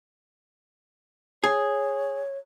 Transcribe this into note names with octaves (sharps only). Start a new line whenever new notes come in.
G#4 C#5